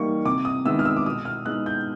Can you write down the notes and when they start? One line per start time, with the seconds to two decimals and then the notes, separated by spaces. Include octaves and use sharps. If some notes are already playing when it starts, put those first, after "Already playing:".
Already playing: E3 G3 A#3 D#4 C#6
0.25 C3 D6
0.45 D#6
0.65 D#3 G#3 B3 E4 E6
0.79 F6
0.85 E6
0.96 D6
1.06 B2 D#6
1.25 F6
1.46 G#3 B3 D#4 F#6
1.66 G6